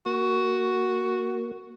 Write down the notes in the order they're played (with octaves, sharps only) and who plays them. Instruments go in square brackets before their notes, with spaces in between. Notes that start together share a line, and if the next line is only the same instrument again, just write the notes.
[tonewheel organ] A#3 [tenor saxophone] F#4